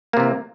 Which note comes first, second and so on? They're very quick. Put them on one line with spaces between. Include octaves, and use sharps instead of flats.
A#3 C3 E3